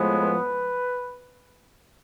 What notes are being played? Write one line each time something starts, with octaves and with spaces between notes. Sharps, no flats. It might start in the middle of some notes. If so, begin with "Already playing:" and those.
Already playing: A2 F3 G#3 B3
B4